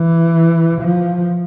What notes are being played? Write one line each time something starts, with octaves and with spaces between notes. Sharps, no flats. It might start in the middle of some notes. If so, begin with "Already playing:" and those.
Already playing: E3
F3